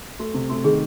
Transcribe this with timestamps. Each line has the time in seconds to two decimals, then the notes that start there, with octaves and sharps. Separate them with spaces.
0.19 A3 F#4
0.34 C3
0.49 A3 F#4
0.64 D#3 G#4